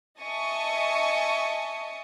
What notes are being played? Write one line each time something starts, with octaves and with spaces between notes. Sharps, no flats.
D#5 E5 G#5 A5 C#6 D#6